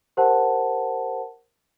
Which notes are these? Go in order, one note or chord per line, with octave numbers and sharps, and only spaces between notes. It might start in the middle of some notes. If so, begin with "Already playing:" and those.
G4 A#4 C5 F#5 A5